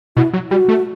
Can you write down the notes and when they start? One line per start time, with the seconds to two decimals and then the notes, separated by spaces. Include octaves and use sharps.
0.17 B2 E4
0.33 F#3
0.51 G3 F#4
0.68 A3